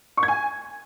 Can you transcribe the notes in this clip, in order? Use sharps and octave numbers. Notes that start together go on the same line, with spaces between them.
C#6
G#6
G#5